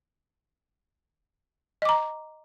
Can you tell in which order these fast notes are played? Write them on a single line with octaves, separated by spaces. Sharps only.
D#5 D6 A#5